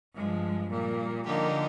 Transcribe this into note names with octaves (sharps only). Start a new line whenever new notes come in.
G2 F3 G#3
A#2 G3 A#3
D3 F3 A#3 D#4 G4